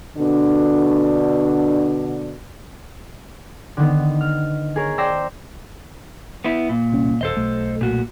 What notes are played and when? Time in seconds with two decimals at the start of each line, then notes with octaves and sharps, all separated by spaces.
0.18 B2 D3 D4
3.77 D3 D#3 B3
4.21 F6
4.76 G#4 A#4 C#5
4.98 C5 D5 G5 E6 A#6 C7
6.44 B3 E4
6.69 A#2
6.92 D1 C2 C#4
7.21 D#1 A4 C5 D#5
7.36 B1 A3
7.81 A#2 F#4